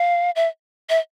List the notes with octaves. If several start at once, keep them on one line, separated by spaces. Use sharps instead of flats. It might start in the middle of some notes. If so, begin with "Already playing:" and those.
Already playing: F5
E5
E5